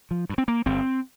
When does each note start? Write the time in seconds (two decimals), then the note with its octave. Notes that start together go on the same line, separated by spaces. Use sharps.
0.11 F3
0.29 G2
0.38 C4
0.48 A#3
0.66 G1 C4